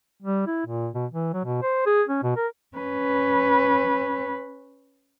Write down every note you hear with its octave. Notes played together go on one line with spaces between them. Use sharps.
G3
E4
A#2
B2
E3
F#3
B2
C5
G#4
C#4
B2
A#4
C#4 B4